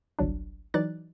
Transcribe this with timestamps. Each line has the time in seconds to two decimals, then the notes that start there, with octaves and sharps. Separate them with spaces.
0.19 G1 C2 F#3 D4
0.74 E3 F#3 D#4 D5 F#6 A6